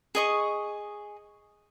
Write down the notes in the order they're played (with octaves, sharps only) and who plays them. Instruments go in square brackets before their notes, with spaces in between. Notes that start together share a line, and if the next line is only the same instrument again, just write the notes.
[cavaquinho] G#4 D#5 C#6